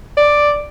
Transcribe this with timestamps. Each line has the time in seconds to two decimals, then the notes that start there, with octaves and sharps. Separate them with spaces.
0.17 D5